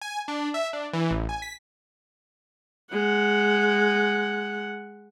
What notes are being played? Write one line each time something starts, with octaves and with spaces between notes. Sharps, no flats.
G#5
D4
E5
D4
E3
A1
G#5
B6
G#3 F#5